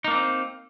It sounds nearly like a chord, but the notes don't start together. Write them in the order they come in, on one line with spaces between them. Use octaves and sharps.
D#4 A#3 D4 C4